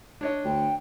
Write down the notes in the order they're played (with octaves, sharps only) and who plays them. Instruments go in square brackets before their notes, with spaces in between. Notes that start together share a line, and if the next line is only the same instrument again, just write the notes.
[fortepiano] D4 C#5 D#5
[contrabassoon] D2 [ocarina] G5